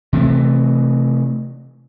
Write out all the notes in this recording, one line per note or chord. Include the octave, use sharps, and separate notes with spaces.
C3 E3 A3